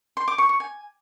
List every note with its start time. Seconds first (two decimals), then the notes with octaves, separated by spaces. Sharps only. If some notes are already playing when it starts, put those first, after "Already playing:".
0.17 C6
0.28 D6
0.38 C#6
0.49 C#6
0.60 G#5